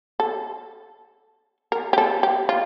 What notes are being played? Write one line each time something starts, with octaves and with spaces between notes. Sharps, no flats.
A4
A#4
G4
A4
G4
F4